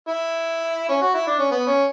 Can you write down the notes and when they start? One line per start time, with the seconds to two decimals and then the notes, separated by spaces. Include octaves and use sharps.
0.08 E4
0.89 C#4
1.01 F#4
1.14 E4
1.27 D4
1.39 C#4
1.51 B3
1.67 C#4